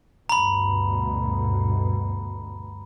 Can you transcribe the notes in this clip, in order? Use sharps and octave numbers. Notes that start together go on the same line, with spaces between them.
D2 G2 B2 A#5 B5